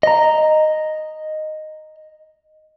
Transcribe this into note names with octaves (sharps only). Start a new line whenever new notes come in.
D#5 A#5